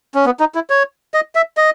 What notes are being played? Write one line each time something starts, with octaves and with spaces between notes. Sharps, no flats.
C#4
B3
D#4
E4
C#5
D#5
E5
D#5